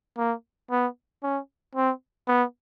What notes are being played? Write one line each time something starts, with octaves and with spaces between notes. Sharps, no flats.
A#3
B3
C#4
C4
B3